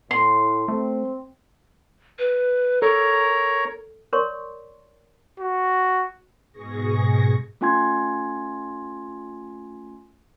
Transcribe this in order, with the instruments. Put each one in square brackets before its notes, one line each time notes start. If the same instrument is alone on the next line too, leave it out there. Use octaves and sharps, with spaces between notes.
[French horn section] A2 [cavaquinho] C6
[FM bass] A3 [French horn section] C4
[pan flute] B4
[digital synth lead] A4 [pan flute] A#4 [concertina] C#5 A#5
[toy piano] A#4 C#5 D5 C6 C#6
[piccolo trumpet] F#4
[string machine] G#2 B2 G#4 C#6 A#6
[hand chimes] A3 C#4 F4 G#5 C6 G#6